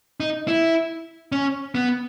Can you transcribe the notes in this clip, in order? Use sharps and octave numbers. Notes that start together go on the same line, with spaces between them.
D#4
E4
C#4
B3